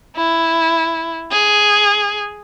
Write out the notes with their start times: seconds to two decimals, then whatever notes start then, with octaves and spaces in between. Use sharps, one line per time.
0.17 E4
1.32 G#4